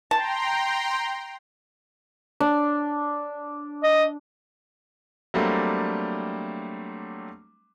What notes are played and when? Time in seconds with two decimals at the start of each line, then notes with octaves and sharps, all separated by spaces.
0.11 G5 A5 A#5 C6
2.40 D4
3.83 D#5
5.34 F#3 G3 A3 A#3 C4 D4